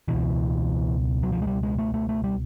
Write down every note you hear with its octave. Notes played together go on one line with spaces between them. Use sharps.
C#2 B2 E3
F#3
F3
G#3
G3
G#3
A3
A3
A3
G3